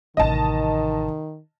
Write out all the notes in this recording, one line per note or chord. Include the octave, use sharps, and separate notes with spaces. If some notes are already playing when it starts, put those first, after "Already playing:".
A1 C3 D#3 D#5 A5